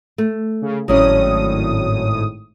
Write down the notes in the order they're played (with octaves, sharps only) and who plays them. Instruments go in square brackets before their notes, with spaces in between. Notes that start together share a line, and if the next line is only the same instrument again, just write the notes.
[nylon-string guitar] A3
[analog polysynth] C#3
[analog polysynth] G#1 A2 D#6 [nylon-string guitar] F#3 C#4 D5